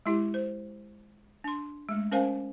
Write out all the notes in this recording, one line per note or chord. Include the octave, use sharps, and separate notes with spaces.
G#3 E4 G4
C5
D4 C6
G#3 A3
C#4 A#4 C5 F5 G#5